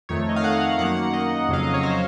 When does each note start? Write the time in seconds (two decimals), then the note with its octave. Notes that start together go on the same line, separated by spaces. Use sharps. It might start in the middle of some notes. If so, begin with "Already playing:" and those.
0.09 F2 D#3 A3 C#5
0.29 D#5
0.36 F5
0.44 F#5
0.79 F#2 D#3 A#3 F#5
1.14 D#5
1.48 F2 C#3 F#3 F5
1.63 D#5
1.74 C#5
1.83 C5